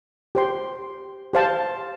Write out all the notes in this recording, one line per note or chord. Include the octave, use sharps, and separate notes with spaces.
G4 C5 G5 C6
G4 C5 F5 A5